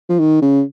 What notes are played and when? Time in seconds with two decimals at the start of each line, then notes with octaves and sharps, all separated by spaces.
0.09 F3
0.19 D#3
0.42 C#3